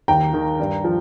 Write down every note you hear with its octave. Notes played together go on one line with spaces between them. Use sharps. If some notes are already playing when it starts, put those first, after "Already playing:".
D#2 G5 A#5
D#3
G2
F3